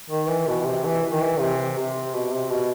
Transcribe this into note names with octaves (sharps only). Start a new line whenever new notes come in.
D#3
E3
B2
B2
C3
E3
D#3
E3
C3
C3
B2
C3
B2